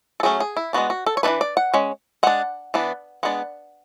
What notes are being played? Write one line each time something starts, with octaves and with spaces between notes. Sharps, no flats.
A4
F#3 A3 C#4 G#4
G#4
E4
G#3 B3 D4 F#4
F#4
A4
C#5
E3 A3 D4 B4
D5
F#5
G#3 C#4
G#3 D4 F#5
E3 B3 D4
G#3 B3 D4 F#5